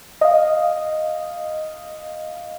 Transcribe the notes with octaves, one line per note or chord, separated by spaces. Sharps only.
D#5 F5